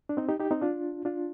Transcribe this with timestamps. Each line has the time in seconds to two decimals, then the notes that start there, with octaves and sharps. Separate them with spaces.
0.09 D4
0.17 C4 D#4
0.29 D#4 G4
0.40 D#4 G4
0.51 C4 D#4
0.61 D4 F4
1.05 D4 F4